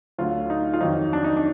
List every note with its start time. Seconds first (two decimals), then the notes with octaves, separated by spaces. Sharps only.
0.18 D2 D3 F#3 F4
0.50 D#4
0.74 F4
0.81 F2 D#3 F#3 D#4
1.13 D4
1.24 D#4
1.37 D4